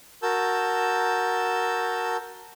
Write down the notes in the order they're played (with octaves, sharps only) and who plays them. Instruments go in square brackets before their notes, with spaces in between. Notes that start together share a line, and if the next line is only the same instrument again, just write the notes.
[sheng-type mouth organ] F#4 A#4 A5 E6 G6